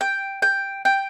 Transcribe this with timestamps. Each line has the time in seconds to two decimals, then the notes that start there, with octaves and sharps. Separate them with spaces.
0.01 G5
0.42 G5
0.85 G5